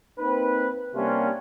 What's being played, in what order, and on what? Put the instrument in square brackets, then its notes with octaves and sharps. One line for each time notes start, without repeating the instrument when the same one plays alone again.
[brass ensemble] A#3 C4 D#4 B4
C3 G3 A#3 C#4 D4 F4